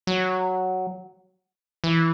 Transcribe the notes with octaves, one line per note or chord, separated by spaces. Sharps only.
F#3
E3